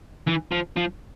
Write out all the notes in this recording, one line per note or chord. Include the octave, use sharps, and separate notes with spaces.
E3
F3
F3